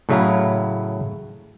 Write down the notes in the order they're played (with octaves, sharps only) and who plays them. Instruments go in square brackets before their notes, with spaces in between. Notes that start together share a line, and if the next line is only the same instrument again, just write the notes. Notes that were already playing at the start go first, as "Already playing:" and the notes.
[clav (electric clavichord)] A2 C#3 F#3 E4 F5 A#5